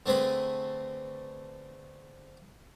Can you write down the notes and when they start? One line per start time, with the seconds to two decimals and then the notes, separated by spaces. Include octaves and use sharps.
0.06 D3 A3 C4 G#4 B4